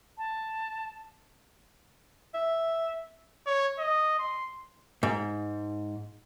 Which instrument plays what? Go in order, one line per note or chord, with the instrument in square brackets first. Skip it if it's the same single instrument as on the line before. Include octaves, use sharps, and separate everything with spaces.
[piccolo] A5
[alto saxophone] E5
[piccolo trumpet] C#5
D#5
C6
[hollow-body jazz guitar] G#2